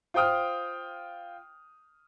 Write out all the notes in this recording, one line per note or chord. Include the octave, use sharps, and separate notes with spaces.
F4 C5 G5 D#6 F6